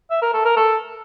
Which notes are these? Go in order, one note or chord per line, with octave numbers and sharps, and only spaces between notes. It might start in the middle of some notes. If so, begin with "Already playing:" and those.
E5
A#4
A4
A#4
A4